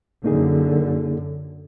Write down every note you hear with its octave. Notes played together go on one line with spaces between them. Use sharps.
F#2 D3 A#3 D#4 G#4